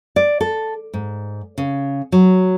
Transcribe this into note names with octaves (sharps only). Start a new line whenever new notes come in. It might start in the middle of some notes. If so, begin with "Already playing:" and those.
D5
A4
G#2
C#3
F#3